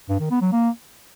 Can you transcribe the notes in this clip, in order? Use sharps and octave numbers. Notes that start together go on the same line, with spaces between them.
G2
D#3
B3
F#3
A#3